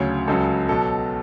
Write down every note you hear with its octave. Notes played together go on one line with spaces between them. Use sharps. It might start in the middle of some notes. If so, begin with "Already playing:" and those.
Already playing: D2 C#3 F#3 C#5
C#2 C#3 F#3 A4
B1 B2 F#3 A4